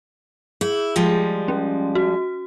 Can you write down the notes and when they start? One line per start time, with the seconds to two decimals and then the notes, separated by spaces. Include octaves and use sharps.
0.61 E4 G#4
0.96 F3 G3 G#3
1.48 C#4
1.95 F#4